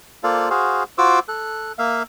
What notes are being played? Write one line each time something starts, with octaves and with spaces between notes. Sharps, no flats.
A#3 F4 A4 C5 D5 F5
F#4 G#4 C5 F5
F4 F#4 C5 D6 E6
A4 F#6
A#3 E5 F5